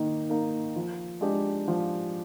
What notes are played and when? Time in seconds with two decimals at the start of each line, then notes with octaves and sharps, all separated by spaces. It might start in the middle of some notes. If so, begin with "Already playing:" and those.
Already playing: D#3 A#3 D#4
0.30 A#3 D#4 A#4
0.76 F3
1.21 G#3 D4 G4
1.68 F3